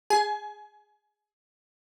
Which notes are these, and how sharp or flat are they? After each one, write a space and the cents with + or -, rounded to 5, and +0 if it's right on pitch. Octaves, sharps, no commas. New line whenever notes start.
G#4 +0 G#5 +35